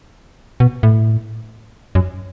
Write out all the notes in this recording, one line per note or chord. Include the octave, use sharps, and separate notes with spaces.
B2
A2
F#2